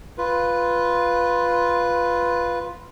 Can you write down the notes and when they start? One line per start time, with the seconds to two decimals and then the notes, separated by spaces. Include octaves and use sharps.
0.18 F4 B4